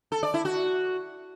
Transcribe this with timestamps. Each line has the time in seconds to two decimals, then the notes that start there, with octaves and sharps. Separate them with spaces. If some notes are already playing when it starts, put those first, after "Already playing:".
0.12 A4
0.23 D5
0.34 E4
0.45 F#4